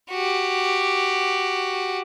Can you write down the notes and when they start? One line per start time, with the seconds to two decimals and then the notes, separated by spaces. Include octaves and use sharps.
0.10 F#4 G4